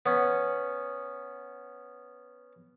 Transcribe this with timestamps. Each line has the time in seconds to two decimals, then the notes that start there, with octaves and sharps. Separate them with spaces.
0.06 B3 C#4